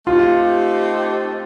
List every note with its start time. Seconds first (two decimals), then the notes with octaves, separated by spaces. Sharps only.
0.06 A3 C4 D#4 F4 G4